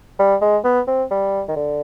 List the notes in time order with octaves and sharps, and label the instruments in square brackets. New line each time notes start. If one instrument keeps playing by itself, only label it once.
[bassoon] G3
G#3
B3
C4
G3
D#3
D3